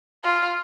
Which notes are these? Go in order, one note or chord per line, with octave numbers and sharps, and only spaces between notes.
F4